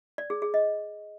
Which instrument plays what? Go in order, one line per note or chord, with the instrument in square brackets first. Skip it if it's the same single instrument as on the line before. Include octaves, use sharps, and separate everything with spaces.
[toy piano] D5
G#4
G#4
D#5